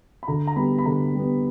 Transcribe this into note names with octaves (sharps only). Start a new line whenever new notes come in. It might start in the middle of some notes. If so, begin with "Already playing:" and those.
B5
D3 A#5
A#5
G3 B3 B5
B5
D3 A#5
G3 B3